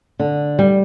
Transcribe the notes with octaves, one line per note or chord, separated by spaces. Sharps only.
D3
G3